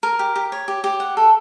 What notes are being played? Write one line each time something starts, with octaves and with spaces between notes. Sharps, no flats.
A#4
G4
G4
C#5
G4
G4
F#5
A4